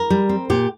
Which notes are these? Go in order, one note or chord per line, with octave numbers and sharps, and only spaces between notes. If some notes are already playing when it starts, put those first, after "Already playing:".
Already playing: A#4
G3
C4
A#2 G4